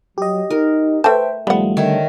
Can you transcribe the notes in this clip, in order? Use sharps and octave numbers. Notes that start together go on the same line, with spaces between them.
F#3 G4 D#5
D#4 A#4
A3 B4 C5 E5 G5 A5
G#1 F3 G3 A3 B3 F#5
D3 D#3 C#5 E5